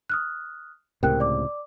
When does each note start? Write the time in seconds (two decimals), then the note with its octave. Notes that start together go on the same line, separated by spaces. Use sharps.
0.10 D#6 F6 F#6
1.03 C#2 A2 C3 A#4 G5 F#6
1.20 D5 D6